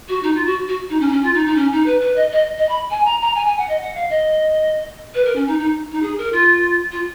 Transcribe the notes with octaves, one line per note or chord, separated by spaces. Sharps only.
F#4
D#4
F4
F#4
F#4
D#4
C#4
D#4
C#4
F4
D#4
D#4
C#4
D#4
B4
B4
D#5
D#5
D#5
B5
G#5
A#5
A#5
G#5
G#5
F#5
D#5
F#5
F5
D#5
B4
A#4
C#4
D#4
D#4
D#4
G#4
A#4
F4
F4